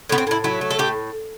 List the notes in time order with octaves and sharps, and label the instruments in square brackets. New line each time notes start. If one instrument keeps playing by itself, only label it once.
[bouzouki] A2 B3
C4
A2 E4
F#3 E4
A3
A4
A2 G4